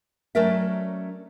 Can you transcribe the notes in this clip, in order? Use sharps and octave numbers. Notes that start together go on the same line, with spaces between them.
F#3 A3 C#4 A#4 D5 E5